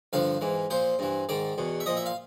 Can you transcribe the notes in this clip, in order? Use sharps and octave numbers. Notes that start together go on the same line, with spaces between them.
G2 D3 F3 F5
G#2 E3
A#2 F3 C5
G2 E3
G#2 D#3 D5
E2 B2
E5
A#2 F3 D#5
E5
F5